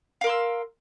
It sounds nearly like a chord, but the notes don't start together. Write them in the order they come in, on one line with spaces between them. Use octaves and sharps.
F5 A#4 C6 E6